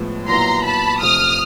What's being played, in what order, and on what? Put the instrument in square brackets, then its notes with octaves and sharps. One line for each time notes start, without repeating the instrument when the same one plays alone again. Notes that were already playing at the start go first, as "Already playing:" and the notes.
Already playing: [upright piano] A2 F3 G#3 B3
[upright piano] A#2 F#3 B3 E4 [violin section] A#5 C6
[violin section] A5 B5
[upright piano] F2 C3 F3 A3 C4 [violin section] D#6 F6